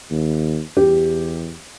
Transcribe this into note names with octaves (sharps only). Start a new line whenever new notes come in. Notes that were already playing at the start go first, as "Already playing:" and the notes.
D#2
E2 G4